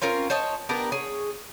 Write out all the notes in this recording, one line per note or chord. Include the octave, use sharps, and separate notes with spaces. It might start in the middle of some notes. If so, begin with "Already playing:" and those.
C4 C#4 F4 A#4
C5 C#5 D#5 A5
B3 D4 G4 A#4
G#4 C#5